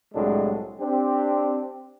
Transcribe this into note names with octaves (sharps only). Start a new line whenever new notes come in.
C2 A2 F#3 G#3 D4 A4
C4 D4 G4